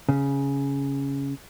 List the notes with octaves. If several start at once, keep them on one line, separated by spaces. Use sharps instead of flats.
C#3